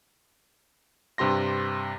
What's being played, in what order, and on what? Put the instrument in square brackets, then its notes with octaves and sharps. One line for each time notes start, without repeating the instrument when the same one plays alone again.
[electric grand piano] G2 C3 G4 C6 A#6